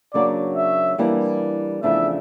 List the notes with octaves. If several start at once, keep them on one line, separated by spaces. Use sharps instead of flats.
C#3 F#3 A#3 D4 F#4 D5
E5
E3 G3 A#3 D4 G4
E2 C#3 F3 A3 D4 E5